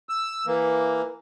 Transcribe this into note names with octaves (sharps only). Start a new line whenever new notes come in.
E6
E3 A#3